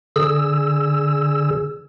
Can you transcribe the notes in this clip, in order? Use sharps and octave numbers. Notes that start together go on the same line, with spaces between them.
D3 G#4 E6